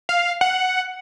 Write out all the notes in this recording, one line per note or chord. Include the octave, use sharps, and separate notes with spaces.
F5
F#5